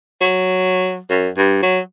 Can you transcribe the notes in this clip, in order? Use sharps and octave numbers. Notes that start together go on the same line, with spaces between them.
F#3
F#2
G2
F#3